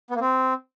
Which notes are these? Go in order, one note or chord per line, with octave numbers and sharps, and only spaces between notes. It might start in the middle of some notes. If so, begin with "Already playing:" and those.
B3
A#3
C4